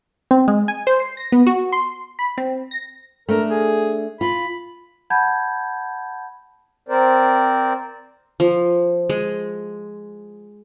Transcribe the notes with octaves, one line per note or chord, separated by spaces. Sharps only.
C4
G#3
G#5
C5
C7
A#6
B3
F#4
C6
B5
C4
A#6
A3 D4 A#4
G#4
F4 B5
F#5 A5 B5 G6 G#6
C4 A#4 C5 D5
F3
G#3